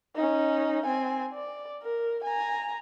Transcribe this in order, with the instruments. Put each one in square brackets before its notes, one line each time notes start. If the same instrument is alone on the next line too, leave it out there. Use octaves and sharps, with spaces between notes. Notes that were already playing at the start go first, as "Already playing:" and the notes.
[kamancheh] C#4 D#4
C4 G#5
D5
A#4
G#5 A#5